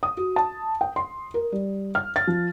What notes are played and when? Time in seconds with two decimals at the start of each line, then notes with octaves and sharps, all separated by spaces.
0.03 D#6
0.17 F#4
0.36 A5
0.81 G5
0.96 C6
1.34 A#4
1.52 G3
1.95 F6
2.16 A6
2.27 F3